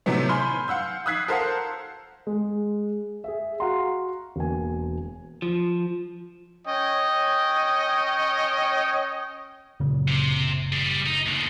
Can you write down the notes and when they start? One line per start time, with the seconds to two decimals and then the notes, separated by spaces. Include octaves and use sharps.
0.06 A2 C3 D#3 F#3 A3 B3
0.29 G#5 B5 C6 F6 G6
0.68 F5 F#5 E6 G6
1.06 D#6 E6 F#6 G#6 B6 C7
1.28 A4 A#4 C5 F5 F#5
2.27 G#3
3.24 G#4 E5
3.60 F#4 F5 F#5 A#5 C6
4.36 E1 A#3 G#5
5.42 F3
6.68 C#4 C#5 D#5 G5
9.80 F#1 A#2 C#3
10.08 C3
10.73 G3 G#4
11.07 D#4
11.26 D#2 D3